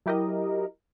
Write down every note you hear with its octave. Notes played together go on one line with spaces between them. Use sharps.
F#3 E4 G4 A#4 D#5